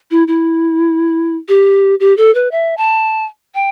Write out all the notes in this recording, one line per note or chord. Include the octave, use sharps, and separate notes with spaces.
E4
E4
G4
G4
A4
B4
E5
A5
G5